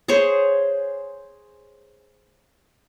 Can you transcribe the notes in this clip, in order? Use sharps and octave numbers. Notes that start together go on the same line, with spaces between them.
G#4 C5 C#5